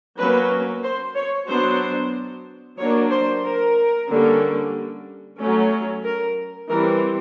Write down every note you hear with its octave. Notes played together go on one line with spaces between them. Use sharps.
F#3 A#3 C#4 B4
C5
C#5
F#3 B3 D4 C5
F#3 A#3 D4 C#5
C5
A#4
D3 G3 A#3 C#4
F#3 A3 C#4
A#4
E3 G3 C4 A#4